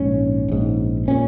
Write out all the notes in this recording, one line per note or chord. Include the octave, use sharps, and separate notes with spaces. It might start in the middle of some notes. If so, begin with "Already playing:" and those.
Already playing: A#1 G#2 C#4
A#1 G#2
A#2 C#4